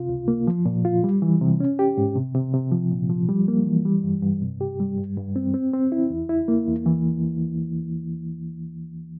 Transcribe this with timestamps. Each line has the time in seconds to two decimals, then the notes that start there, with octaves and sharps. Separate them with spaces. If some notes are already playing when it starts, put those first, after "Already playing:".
Already playing: C3 F4
0.09 C#2
0.28 A#3
0.47 F3
0.66 A#2
0.85 F4
1.04 G3
1.22 E3
1.41 C3
1.60 C#4
1.79 G4
1.98 G#2
2.16 C3
2.35 C3
2.54 C3
2.72 F3
2.91 A#2
3.09 F3
3.29 G3
3.48 A#3
3.66 E3
3.85 G3
4.04 G2
4.22 G2
4.42 C3
4.61 G4
4.80 G3
4.98 G2
5.17 G2
5.36 C4
5.54 C4
5.73 C4
5.92 E4
6.10 E2
6.29 E4
6.48 A#3
6.67 E2
6.86 E3